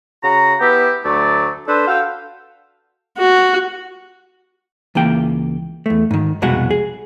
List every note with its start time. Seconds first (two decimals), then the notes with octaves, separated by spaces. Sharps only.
0.23 C#3 F#4 A#5
0.61 B3 E4 G4
1.05 D2 F#3 A3 D5
1.68 D4 A4 B4 C5
1.88 F#4 A4 F5 G5
3.18 F#4
4.95 C#2 E3 A#3 G5
5.86 E2 A3
6.11 G#2 D#3
6.42 C2 F2 B2 G#3 F#4 F#5
6.71 G#4